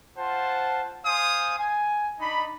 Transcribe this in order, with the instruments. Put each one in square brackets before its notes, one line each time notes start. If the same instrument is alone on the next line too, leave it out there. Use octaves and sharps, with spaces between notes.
[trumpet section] F4 C5 F#5 A5
C5 F5 G#5 D#6
G#5
D4 D#4 B5